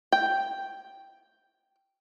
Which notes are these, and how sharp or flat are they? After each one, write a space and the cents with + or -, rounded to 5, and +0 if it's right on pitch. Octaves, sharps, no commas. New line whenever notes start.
G5 +0